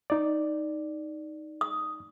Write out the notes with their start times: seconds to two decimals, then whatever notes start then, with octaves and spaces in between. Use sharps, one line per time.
0.10 D#4 D5
1.61 D#6